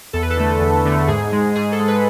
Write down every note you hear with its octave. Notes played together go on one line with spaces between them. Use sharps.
E2 A4
B4
A4
D3 A3
E2
D3 A3
G#2 G#4
G#3
G#2 G#4
A4
G#3
B4